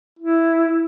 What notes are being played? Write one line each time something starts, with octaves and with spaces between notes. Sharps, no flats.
E4